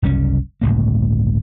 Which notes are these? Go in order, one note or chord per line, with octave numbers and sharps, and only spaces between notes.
F#1 C2 G3 C#4
G1 C#2 A2 A#3